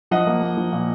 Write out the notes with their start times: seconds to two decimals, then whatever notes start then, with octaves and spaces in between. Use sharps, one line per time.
0.11 F3 D#5 F#5
0.27 A#3
0.42 A#3
0.57 F3
0.72 A#2